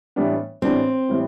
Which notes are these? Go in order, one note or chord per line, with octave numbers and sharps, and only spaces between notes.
A2 E3 G3 B3 D4
A2 E3 G3 B3 C4 D4
A2 E3 G3 B3